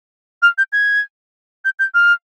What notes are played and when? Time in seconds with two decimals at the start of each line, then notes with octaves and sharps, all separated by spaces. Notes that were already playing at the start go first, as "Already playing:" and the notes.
0.42 F6
0.58 G6
0.73 G#6
1.65 G6
1.79 G6
1.94 F6